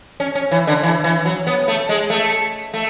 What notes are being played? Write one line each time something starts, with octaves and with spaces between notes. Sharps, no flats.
C#4
C#4
E3
D3
E3
E3
F#3
B3
A3
G#3
A3
A3